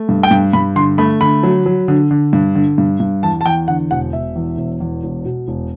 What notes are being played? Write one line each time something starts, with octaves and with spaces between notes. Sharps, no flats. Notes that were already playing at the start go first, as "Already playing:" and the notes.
Already playing: A3
G2
G5
G2
G2 B5
D3 C6
A3 B5
D3 B5
F#3
F#3
D3
D3
G2
D3
G2
G2
E2 A5
A5
E2 G5
D3 F#5
E1 F#5
E1 E5
E2
E1
E2
E1
B2
E1